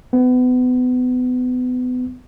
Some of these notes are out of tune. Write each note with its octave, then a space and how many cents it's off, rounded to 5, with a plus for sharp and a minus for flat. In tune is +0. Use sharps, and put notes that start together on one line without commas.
B3 +30